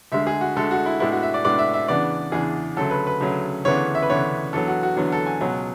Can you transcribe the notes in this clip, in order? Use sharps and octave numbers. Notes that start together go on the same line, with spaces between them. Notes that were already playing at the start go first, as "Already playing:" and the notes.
D2 D3 G#3 E5
G#4
F#4
D2 D3 G#3 A4
F#4
E4
A2 G#3 B3 D4 E4
F#4
E5
D5
A2 G#3 B3 D4 D5
E5
E5
E2 C#3 E3 B3 D4 D5
E2 C#3 E3 B3 D4 G#4
D2 C#3 F#3 A4
B4
B4
D2 C#3 F#3
D2 C#3 E3 B3 D4 C#5
E5
B4
D2 C#3 E3 B3 D4 C#5
E2 D3 F#3 B3 A4
F#4
F#4
E2 D3 F#3 B3 F#4
A4
G#5
C#2 B2 F#3 B3